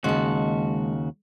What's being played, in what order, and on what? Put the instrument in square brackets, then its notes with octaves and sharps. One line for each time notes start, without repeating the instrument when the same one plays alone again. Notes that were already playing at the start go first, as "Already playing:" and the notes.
[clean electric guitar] D#2 C#3 F#4 [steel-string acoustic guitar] G#3 A5